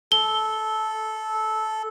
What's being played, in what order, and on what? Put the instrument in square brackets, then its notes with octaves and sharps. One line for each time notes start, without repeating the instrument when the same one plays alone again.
[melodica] A4 [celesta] G7